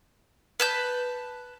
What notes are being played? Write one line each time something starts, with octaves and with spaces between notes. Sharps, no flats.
B4 A5 G6